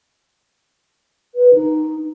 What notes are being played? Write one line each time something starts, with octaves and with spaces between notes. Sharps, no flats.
B4
D#4